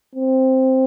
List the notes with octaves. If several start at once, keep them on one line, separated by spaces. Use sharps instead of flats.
C4